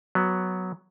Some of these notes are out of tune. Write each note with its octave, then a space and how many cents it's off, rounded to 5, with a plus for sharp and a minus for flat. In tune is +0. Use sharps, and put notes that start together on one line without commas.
F#3 +0 B3 +0